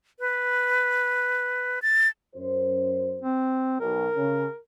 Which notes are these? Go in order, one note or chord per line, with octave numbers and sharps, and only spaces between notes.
B4
A6
F#2 C5
C4
B1 A#4
C#3